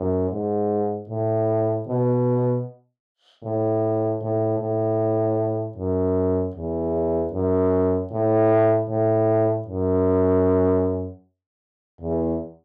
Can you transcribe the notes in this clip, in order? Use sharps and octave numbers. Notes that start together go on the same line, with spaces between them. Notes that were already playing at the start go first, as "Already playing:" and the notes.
Already playing: F#2
G#2
A2
B2
A2
A2
A2
F#2
E2
F#2
A2
A2
F#2
E2